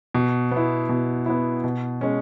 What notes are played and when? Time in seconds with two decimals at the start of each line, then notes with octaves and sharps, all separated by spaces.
0.15 B2
0.51 B3
0.57 E4
0.89 B2
1.26 B3 E4
1.64 B2
2.01 G#3 C#4